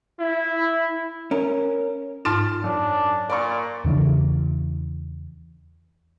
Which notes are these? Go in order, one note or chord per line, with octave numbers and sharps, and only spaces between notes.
E4
C#4 A#4
G#2 D#4 F4 C6 F6 A6
F#2 D4
A#2 D5 B5 C#6
E2 C#3 E3 D4